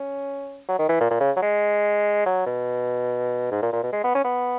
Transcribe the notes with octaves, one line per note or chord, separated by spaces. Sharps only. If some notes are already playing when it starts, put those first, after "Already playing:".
Already playing: C#4
F#3
D#3
E3
A#2
A#2
C#3
F#3
G#3
F#3
B2
G#2
A#2
A#2
B2
G#3
B3
C#4
B3